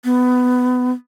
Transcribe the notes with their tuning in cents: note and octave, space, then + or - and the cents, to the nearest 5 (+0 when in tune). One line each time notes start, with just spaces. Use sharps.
B3 +20